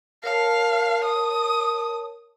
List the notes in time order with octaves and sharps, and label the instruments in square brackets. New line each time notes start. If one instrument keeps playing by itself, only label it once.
[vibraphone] A#4 C#5 A5 [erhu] F5
[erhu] D#6